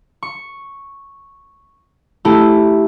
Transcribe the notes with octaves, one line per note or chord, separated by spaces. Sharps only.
C#6
A3 E4 G4